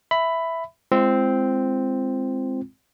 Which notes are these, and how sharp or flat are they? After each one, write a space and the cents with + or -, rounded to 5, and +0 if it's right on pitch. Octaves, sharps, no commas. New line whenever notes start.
E5 +0 B5 +10
G#3 +0 C4 +0 F4 -35